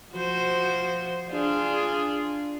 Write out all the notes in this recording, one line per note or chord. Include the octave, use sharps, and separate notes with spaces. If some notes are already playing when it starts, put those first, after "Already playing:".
F3 F#4 C5
D4 F4 G#4